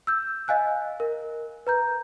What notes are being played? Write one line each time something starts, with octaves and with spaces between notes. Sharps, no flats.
E6 G6
D#5 F5 G#5 F#6
A#4
B4 A#5 G6